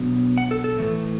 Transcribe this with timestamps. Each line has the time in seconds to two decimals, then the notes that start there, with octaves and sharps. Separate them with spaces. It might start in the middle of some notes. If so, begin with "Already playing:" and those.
Already playing: B2 F#3 B3 D4
0.38 F#5
0.51 A4
0.64 A4
0.78 A2 E3 A3